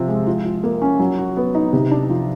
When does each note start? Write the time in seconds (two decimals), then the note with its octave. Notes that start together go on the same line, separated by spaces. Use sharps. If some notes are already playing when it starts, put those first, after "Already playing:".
Already playing: C3 F3 C4
0.08 G#3
0.27 F3
0.45 F4
0.64 A#3
0.82 C#4
1.00 F#3
1.18 F#4
1.37 B3
1.55 D#4
1.73 C3
1.91 D4
2.10 F3